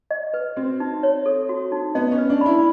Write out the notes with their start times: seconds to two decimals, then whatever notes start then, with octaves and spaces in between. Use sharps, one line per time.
0.11 D#5
0.34 B4
0.57 C4 F#4
0.80 D#4
1.03 C#5
1.26 A4
1.49 F#4
1.72 D#4
1.95 B3 D#5
2.12 C#4
2.18 B4
2.30 D4
2.41 E4 B5